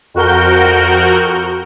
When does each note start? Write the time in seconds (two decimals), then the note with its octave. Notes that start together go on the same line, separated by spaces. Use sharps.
0.14 F2 F#4 A#4 G6